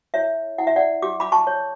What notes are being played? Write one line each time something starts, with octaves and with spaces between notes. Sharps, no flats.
E4 C#5 E5
E4 F#5
E5
D5 F#5
G4 D6
B5 D6
A5 C#6
C#5